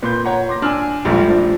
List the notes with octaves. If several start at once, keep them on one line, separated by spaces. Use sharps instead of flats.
A#2 B4 C6 G6
C#5 F#5 A#5
C6 D6 A#6
D4 G#5 E6 F6
A#1 G#2 G3 A3 F4
A2 F3 D4